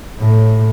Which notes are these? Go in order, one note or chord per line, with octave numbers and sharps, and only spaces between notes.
A2